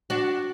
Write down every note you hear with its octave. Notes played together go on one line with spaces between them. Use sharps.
D4 F#4